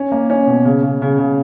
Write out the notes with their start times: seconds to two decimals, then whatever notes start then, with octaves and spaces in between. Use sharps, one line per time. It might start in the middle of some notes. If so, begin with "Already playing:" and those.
Already playing: C#4
0.12 A#3
0.30 C#4
0.47 B2
0.65 C#3
0.83 C#3
1.02 C#3
1.19 C#3